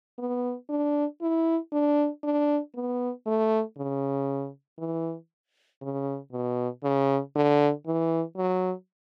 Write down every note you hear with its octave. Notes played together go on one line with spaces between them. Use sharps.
B3
D4
E4
D4
D4
B3
A3
C#3
E3
C#3
B2
C#3
D3
E3
F#3